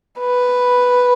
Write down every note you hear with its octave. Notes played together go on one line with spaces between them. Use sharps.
B4